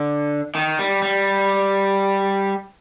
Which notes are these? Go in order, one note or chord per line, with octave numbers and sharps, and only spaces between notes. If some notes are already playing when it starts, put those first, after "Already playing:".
Already playing: D3
D#3
G3
G3